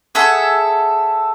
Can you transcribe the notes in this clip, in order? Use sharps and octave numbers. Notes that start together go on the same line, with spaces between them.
G#4 A4 E5 F#5